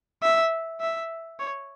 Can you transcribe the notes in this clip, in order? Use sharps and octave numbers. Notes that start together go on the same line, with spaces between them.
E5
E5
C#5